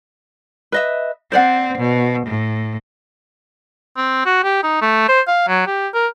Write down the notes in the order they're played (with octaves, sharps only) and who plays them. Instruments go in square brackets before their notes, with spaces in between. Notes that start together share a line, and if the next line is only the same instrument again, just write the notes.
[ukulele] B4 D#5 E5
[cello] C4 [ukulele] C5 D5 F#5
[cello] B2
A2
[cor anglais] C4
F#4
G4
D#4
A3
C5
F5
F#3
G4
A#4